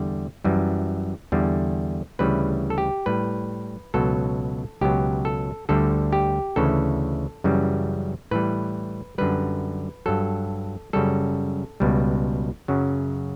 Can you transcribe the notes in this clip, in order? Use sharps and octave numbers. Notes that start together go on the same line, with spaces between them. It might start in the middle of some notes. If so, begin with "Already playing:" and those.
Already playing: E2 D3 G3
F#2 E3 G3
E2 D3 G3
D2 C#3 E3 G3 B4
A4
G4
A2 G3 B4
C#2 B2 F#3 A4
C#2 B2 F#3 G4
A4
D2 D3 G3 A4
G4
D2 C#3 E3 A4
F#2 C#3 E3 G3
A2 E3 G3 B4
F#2 D3 G3 B4
G2 F#3 A4
F#2 C#3 G3 A4
C#2 B2 G3
F#2 C#3 F#3